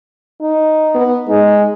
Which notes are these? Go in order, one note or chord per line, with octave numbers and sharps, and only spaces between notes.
D#4
B3
G#3 D#4